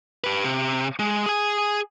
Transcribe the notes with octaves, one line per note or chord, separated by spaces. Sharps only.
G4 B4
C3
G#3
G#4 G#5